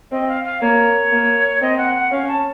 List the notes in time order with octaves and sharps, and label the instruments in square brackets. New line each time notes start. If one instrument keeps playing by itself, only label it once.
[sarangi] C4 [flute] D#5
[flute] F5
F5
[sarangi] A#3 [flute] C#5
[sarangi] A#3
[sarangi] C4 [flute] D#5
[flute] F#5
F#5
[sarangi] C#4 [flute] F5
[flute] A5